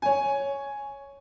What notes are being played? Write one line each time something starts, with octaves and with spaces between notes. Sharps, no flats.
C#5 G#5